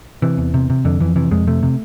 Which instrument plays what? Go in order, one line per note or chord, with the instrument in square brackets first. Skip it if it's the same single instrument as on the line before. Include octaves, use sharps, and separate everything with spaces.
[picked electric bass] C3 E3
E2
C3
C3
F2 D3
F2 E3
C3 E3
F2 G#3
C3 A3
C3